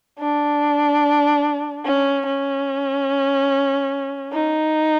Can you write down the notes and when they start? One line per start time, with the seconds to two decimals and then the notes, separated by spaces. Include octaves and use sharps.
0.19 D4
1.85 C#4
2.26 C#4
4.33 D#4